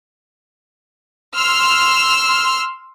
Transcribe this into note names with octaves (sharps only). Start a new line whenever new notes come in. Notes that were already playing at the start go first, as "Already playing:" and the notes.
C6 E6 F6